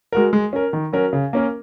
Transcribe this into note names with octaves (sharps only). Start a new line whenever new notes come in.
G#3 F#4 A#4
G#3
C#4 A#4
D#3
F#3 C#4 F#4 A#4
C#3
A#3 C#4 A#4